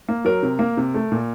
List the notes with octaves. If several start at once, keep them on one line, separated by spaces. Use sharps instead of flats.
A#3
F#3 A#4
C3
A#3
C3
A3
A#2